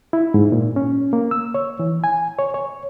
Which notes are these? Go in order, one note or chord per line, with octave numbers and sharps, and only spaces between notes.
E4
G#2
A#2
C#4
A#3
E6
C#5
E3
G#5
C#5
C#5